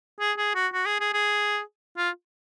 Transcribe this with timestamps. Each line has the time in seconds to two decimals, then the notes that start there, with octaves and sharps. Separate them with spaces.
0.20 G#4
0.38 G#4
0.55 F#4
0.73 F#4
0.86 G#4
1.00 G#4
1.13 G#4
1.97 F4